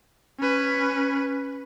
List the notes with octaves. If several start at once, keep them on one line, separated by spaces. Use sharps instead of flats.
C#4 B4